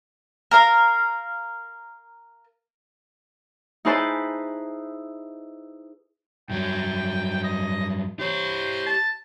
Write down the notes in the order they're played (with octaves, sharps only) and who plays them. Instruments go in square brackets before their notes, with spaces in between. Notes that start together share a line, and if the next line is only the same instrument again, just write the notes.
[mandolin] A#4 F5
[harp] D#4 E4 G#4 B4 C5 A5
[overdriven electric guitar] G2 F#3 [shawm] G5
[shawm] D#5
[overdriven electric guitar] G4 C#5 [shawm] C5
[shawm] A5